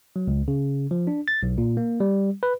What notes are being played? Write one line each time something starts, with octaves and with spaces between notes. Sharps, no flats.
F#3
C#2
C#3
F3
D4
A6
B1
A#2
A#3
G3
B4